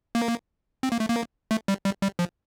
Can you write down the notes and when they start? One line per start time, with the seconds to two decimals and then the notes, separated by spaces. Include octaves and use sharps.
0.15 A#3
0.83 C4
0.92 A#3
1.00 A3
1.09 A#3
1.51 A3
1.68 G3
1.85 G3
2.02 G3
2.19 F3